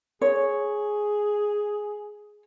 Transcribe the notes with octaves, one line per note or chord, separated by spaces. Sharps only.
G#4 C#5